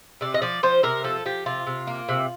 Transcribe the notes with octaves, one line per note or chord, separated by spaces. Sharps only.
C3 D5
D#5
F3 D5
F3 C5
C3 A#4
F3 A4
F3 G4
C3 F4
C3
A#3
C3